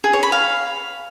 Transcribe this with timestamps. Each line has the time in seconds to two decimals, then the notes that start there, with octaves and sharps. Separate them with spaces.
0.04 G#4
0.13 C#5
0.23 B5
0.32 F5